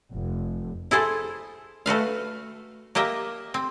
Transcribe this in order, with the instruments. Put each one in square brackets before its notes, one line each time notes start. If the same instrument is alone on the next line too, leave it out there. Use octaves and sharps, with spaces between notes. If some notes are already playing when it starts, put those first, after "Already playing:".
[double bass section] F1
[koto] E4 G#4 A4 C5
A3 F#4 B4 F5
A#3 G4 D#5 E5
C4